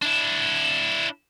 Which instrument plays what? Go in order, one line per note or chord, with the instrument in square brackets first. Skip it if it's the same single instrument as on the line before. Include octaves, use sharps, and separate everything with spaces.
[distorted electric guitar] D4 E4